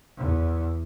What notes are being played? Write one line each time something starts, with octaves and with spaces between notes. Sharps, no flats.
E2